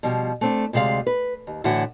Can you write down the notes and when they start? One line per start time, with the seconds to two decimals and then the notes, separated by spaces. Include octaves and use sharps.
0.03 B2 F3 G3
0.41 A3 C4 D4
0.73 D2 C3 G#3 D5 F5
1.07 B4
1.47 D#2
1.64 A2 D3 E3 F#4 E5 F#5